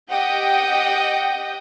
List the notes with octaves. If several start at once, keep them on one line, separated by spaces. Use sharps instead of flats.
G4 D#5 F#5 G5 D#6 G6